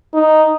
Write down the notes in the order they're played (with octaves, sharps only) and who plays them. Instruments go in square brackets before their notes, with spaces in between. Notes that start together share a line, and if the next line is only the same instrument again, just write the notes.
[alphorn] D#4